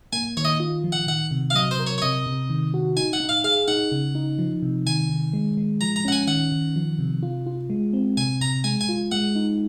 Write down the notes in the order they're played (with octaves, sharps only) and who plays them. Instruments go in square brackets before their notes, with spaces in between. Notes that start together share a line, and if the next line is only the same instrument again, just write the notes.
[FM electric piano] A#3 [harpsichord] G#5
[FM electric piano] D#3 [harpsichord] C#5
[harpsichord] D#5
[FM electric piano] F4
F3
[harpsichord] F#5
[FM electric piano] D#3 [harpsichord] F#5
[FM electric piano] C3
[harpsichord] F5
[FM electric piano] F#3 [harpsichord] D#5
[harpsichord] C5
[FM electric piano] A#4
[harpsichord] C#5
C#5
[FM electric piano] C3 [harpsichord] D#5
[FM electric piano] C3
D#3
F#4
[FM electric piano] D#4 [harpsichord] G#5
[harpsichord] F#5
[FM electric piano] D#4
[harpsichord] F5
[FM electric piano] G#4 [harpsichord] F5
[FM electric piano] D#4 [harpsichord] F#5
[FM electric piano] C#3
D#4
F3
C3
[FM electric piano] D#3 [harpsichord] G#5
[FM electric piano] D#3
G#3
G#3
[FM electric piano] F3 [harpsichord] A#5
[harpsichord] A#5
[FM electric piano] C#4 [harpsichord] F#5
[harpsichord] G#5
[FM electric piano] D#3 [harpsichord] F#5
[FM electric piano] D#3
F3
C3
F4
F4
G#3
C4
[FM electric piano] C3 [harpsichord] G#5
[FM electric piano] C3 [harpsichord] A#5
[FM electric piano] G#3 [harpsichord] G#5
[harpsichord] G#5
[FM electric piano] F4
[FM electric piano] G#3 [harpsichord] F#5
[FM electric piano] D#4